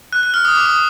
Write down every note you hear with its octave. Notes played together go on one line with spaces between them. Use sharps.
F#6
F#6
F6
D#6
D6
D#6